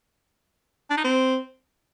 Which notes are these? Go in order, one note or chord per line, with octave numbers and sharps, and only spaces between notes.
D4
D#4
C4